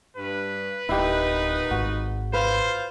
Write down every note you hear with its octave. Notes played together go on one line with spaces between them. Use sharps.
G2 B4
D1 A#2 B3 D#4 E4 G4
G#1 G#2 G#3 F#4
F4 B4 C5 F5